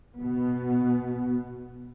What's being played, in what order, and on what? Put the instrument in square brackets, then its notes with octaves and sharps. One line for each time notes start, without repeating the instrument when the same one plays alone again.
[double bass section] B2 B3